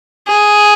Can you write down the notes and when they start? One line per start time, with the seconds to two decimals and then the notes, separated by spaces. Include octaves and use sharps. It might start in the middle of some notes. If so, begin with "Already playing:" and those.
0.28 G#4